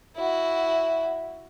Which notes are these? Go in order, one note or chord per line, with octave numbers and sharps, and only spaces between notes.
E4 F#4